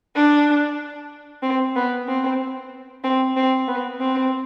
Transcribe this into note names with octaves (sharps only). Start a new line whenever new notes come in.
D4
C4
B3
C4
C4
C4
B3
C4